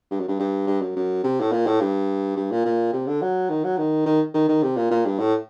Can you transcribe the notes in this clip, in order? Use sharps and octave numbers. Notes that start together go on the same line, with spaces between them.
G2
F#2
G2
G2
G2
F#2
F#2
C3
A2
A#2
A2
G2
G2
A#2
A#2
C3
D3
F#3
D#3
F#3
D#3
D#3
D#3
D#3
C3
A#2
A#2
G2
A2